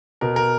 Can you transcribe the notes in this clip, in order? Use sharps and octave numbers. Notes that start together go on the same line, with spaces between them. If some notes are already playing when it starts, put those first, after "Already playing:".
B2 A#4
A#4